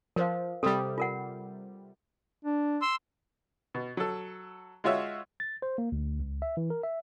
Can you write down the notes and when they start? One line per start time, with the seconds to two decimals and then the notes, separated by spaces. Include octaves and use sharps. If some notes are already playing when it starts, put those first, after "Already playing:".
0.16 F3 A#4 C5 F5
0.63 C3 G3 A4
0.98 F4 A#4 F#5
2.45 D4
2.82 C6 E6
3.74 B2
3.97 F#3 A4
4.84 G#3 F4 F#4 C#5 E5
5.40 A6
5.62 C5
5.78 A#3
5.92 D2
6.20 C#2
6.42 E5
6.57 E3
6.70 A#4
6.83 E5